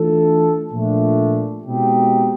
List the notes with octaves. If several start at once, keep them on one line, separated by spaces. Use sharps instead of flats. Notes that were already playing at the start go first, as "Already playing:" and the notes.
Already playing: E3 A3 D4 F4 A4
A#2 F3 A3 D4
B2 G#3 C4 D#4 G4